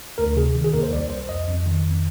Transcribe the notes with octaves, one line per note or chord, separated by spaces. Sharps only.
D2 A#4
C3 G#4
D#3
G#4
D#2 A#4
C5
C2 D5
C2 C5
F2 D#5
F2
D#3
F2